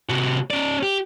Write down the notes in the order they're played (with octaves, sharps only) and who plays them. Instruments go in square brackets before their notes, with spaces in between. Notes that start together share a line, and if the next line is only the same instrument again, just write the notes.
[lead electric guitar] C3 F#4
C#4 D5
G4